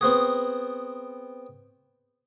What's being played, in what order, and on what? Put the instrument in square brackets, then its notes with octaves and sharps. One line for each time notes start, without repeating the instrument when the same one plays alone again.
[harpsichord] B3 C4 F#4 G#4